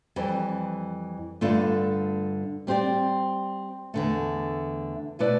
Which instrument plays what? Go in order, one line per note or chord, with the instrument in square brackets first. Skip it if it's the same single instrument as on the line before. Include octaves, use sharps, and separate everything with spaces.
[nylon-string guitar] F2 E3 G3
G2 D3 A3 D4 F4
G3 C4 G4 D5
E2 D3 A3
B2 A3 E4 B4 D5